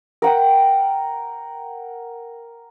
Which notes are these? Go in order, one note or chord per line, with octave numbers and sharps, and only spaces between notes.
A#4 F#5 G5